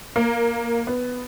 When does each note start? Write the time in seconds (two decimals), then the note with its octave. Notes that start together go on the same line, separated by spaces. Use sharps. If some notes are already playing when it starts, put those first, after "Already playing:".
0.16 A#3
0.87 B3